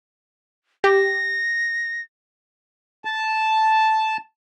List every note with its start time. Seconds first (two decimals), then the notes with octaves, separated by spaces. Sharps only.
0.84 G4 A#6
3.05 A5